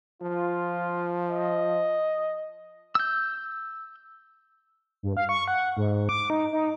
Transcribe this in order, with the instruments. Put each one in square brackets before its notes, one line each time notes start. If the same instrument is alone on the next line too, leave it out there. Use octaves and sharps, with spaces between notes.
[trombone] F3 [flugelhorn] F4
[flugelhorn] D#5
[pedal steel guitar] E6 G6
[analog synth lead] G2
F5
C#6
F#5
G#2
D6
D#4
D#4